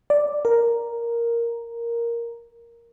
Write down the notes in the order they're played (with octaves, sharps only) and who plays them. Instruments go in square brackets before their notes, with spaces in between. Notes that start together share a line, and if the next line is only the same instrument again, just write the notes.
[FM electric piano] D5
A#4